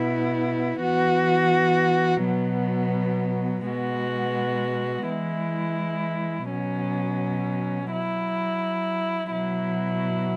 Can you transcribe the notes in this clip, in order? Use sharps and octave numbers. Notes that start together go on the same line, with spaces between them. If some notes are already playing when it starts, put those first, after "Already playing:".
Already playing: B2 B3 E4
E3 B3 F#4
B2 F#3 B3
B2 G#3 B3 F#4
E3 G#3 E4
B2 F#3 C#4
F#3 E4
B2 F#3 E4